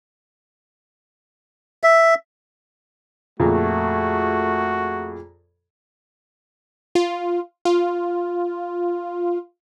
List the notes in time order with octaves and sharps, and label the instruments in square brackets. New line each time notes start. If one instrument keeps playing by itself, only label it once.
[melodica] E5
[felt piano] F2 A#2 [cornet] A3 [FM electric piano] F4 G#4 A#5 [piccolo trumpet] F#4
[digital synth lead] F4
F4